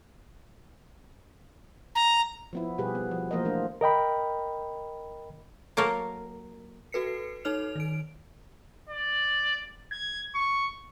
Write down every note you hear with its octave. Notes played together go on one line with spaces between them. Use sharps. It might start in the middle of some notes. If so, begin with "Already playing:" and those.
A#5
F3 B3 E4
B2 G3 G4 G#4 B4
B3
F3
E3 F3 A#3 A#4 C5 D#5
E3 A3 D4 F4
A#4 D#5 G5 B5
F#3 A#3 A4 A#4
F#4 A4 B4 C7 C#7
D#4 A4 C#5 F6 F7
D#3 D7
D5
G#6
C#6